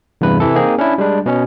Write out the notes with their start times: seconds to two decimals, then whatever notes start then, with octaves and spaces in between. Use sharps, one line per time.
0.21 E2 G2 C3 B4
0.40 C3 E3 A4
0.55 A#3 C4 D#4 G#4
0.78 C#4 D4 E4
0.98 G3 G#3 D4
1.26 B2 C#4